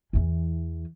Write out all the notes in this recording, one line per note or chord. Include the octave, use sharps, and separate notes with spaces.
E2 E3